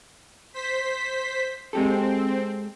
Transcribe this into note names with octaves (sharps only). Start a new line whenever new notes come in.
C5 B6
G#3 C4 G4 A4